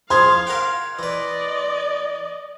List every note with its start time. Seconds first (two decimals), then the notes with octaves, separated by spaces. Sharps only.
0.10 F3 G#4 C5 F5 C6 G#6
0.47 A#4 F#5 G5
0.99 E3 B4 D5 D#5